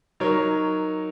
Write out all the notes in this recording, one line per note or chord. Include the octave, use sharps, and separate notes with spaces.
F#3 D#4 A#4 C#5